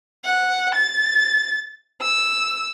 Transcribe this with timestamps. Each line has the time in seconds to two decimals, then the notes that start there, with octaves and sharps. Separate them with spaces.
0.25 F#5
0.75 A6
2.01 E6